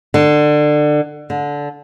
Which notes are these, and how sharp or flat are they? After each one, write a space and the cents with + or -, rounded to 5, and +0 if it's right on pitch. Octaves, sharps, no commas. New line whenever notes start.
D3 +25
D3 -15